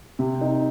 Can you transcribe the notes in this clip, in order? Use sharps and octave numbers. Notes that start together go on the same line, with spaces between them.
C3
D#4